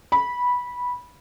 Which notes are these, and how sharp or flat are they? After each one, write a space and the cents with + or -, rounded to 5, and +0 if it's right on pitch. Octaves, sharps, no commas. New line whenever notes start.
B5 -10